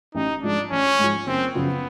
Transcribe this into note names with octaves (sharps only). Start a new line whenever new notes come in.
A1 D#4
G#2 F3 D4
A1 C#4
G#2 F3
F#1 C4
F#2 C#3 F3 B3